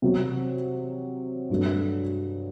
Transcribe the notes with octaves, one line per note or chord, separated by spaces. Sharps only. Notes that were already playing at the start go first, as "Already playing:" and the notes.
C3 F#3 C4 F#4
G2 F#3 A3